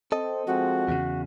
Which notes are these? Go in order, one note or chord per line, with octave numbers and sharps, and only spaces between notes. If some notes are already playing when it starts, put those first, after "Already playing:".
C4 A4 D#5
F3 G#3 C4 F#4
E2 C#3